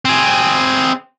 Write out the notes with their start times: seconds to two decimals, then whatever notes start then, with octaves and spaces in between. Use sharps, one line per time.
0.05 C4 G#4